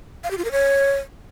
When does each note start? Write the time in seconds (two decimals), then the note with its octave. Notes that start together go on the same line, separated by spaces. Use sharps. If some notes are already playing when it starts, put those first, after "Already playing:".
0.24 F5
0.31 G4
0.37 F4
0.44 A#4
0.51 C#5